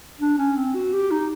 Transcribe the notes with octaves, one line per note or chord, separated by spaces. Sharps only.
D4
C#4
C4
F#4
G4
D#4